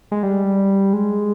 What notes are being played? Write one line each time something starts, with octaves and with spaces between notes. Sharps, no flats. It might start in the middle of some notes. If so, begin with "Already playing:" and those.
G#3
G3
G#3